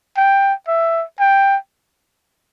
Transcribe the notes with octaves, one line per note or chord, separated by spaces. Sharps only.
G5
E5
G5